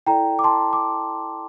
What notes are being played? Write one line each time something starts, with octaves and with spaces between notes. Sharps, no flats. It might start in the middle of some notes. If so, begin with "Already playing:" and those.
E4 A4 D5 G5 A#5
D6
A5 C6
D6